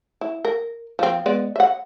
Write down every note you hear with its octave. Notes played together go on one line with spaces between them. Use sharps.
E4
A#4
F3 C4
G#3 B3 D5
E5 F#5